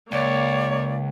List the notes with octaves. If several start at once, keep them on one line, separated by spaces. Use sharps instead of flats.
C#2 A#3 C#5 D5